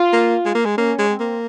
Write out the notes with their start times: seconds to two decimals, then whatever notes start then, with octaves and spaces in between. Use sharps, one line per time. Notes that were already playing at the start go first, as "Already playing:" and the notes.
Already playing: F4
0.13 A#3
0.45 G#3
0.55 A#3
0.65 G#3
0.77 A#3 C#4
0.98 G#3
1.09 C4
1.20 A#3